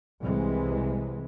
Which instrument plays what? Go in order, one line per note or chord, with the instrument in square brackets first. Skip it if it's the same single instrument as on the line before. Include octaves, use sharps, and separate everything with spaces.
[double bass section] C2 C3 E3 G#3